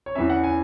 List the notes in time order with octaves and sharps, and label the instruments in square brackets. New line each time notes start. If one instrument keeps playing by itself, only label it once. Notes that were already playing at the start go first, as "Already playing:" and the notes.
[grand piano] C#5
E2 E3 C#4 E5
F#5
G#5